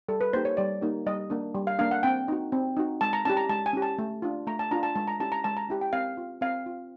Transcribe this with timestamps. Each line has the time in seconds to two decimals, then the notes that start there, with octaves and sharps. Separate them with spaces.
0.08 G3 A4
0.21 B4
0.33 A#3 D#4 G4 C5
0.45 C#5
0.57 G3 D5
0.81 A#3 D#4 G4
1.06 G3 D#5
1.30 A#3 D4
1.55 G3
1.67 F5
1.79 A#3 D4 F5
1.91 F#5
2.03 C4 G5
2.28 D#4 F#4
2.52 C4
2.77 D#4 F#4
3.01 G#3 A5
3.13 A#5
3.25 C#4 E4 G4 A5
3.37 A#5
3.49 G#3 A5
3.66 G#5
3.73 C#4 E4 G4
3.82 A5
3.99 A3
4.22 D4 F4
4.47 A3 A#5
4.59 A5
4.71 D4 F4 A#5
4.83 A5
4.95 G#3 A5
5.08 A#5
5.20 C#4 E4 G4 A5
5.32 A#5
5.44 G#3 A5
5.57 A#5
5.69 C#4 E4 G4
5.81 G5
5.93 C4 F5
6.17 F4
6.41 C4 F5
6.66 F4